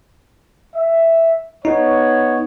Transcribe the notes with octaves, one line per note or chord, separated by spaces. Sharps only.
E5
B3 D#4 C#5